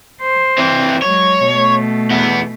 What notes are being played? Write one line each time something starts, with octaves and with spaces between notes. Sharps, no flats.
C5
E3 C4
F#3 G#3 C#5
B2 A3
E2 B3